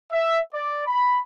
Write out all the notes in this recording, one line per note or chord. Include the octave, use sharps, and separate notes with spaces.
E5
D5
B5